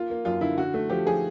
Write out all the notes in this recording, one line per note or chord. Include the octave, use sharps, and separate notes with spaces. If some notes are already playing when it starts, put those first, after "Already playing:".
Already playing: A#3 F4
A#3
F#2 F4
D3 E4
D3 F#4
A3
F3 G4
F3 G#4